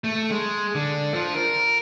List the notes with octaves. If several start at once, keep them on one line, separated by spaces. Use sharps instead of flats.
A3
G#3
D3
F3
A#4